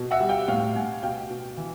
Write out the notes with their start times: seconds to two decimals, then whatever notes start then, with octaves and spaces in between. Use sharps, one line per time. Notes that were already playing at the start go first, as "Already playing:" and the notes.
Already playing: B2
0.11 E5 F#5
0.20 G3
0.29 F5 G5
0.48 A2 F5 G5
0.76 A2 F#5 G#5
1.03 B2 F5 G5
1.30 B2
1.57 E3